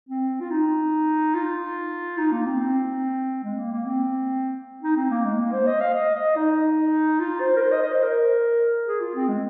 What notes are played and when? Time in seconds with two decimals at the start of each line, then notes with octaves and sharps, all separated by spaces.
0.09 C4
0.41 F4
0.51 D#4
1.34 F4
2.18 D#4
2.32 A#3
2.46 C4
2.60 C4
3.44 G#3
3.57 A#3
3.72 A#3
3.86 C4
4.83 D#4
4.97 C4
5.11 A#3
5.25 G#3
5.39 A#3
5.52 C5
5.67 D#5
5.80 F5
5.94 D#5
6.15 D#5
6.36 D#4
7.20 F4
7.41 C5
7.56 A#4
7.61 C5
7.72 D#5
7.83 D#5
7.93 C5
8.03 A#4
8.87 G#4
9.00 F4
9.15 C4
9.28 G#3